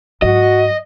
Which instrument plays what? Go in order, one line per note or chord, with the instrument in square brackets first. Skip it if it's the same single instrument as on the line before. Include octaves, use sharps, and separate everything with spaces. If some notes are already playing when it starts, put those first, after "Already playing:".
[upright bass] G#2 F#3 [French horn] F#4 [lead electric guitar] D#5